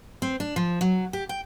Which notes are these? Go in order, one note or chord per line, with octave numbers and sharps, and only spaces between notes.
C4
D4
F3
F#3
G4
G5